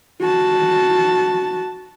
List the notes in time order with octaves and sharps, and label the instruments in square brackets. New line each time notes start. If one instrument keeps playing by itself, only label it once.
[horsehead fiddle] F#4 A5